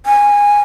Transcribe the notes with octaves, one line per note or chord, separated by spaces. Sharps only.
G#5